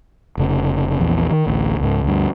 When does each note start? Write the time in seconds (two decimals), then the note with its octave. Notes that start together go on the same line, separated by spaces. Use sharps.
0.37 F1 C#3
0.99 A#1 E2
1.31 D#3
1.46 A1 D2
1.80 C#2 G#2
2.04 D2 G2